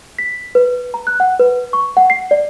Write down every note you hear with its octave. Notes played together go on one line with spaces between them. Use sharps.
B6
B4
A#5
F#6
F#5
B4
C#6
F#5
C7
D5